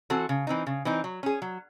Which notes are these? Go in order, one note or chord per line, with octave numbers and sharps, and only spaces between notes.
E3 C4 F#4 A4
C#3
E3 C4 D#4
C#3
E3 C4 D#4
F#3
C#4 G#4
F#3